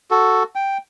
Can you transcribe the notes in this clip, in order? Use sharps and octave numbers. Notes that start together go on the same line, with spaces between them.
F#4 A4
G5